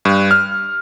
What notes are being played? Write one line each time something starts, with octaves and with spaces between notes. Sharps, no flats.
G2
F6